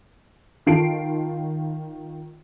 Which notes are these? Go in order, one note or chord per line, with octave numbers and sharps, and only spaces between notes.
D#3 F4 A5 C7 D7